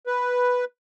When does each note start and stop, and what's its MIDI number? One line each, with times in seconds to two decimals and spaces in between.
0.07 0.65 71